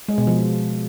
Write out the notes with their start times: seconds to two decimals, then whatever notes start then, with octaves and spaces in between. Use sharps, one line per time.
0.08 G#3
0.18 B2
0.27 F3